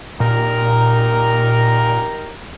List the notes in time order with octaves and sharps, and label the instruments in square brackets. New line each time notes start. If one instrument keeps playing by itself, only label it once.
[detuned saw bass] A#2 [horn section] D#4 G4 A#4